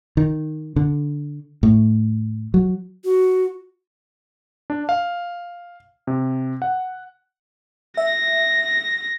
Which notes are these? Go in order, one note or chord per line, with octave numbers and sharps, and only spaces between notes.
D#3
D3
A2
F#3
F#4
D4
F5
C3
F#5
E5 A#6